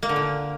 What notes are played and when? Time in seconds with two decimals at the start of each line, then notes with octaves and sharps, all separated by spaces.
0.03 A#3
0.09 D3
0.16 A#2